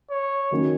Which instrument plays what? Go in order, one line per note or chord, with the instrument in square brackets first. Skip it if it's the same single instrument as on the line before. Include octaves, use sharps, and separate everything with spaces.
[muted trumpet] C#5
[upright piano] D#3 F#3 A#3 C#4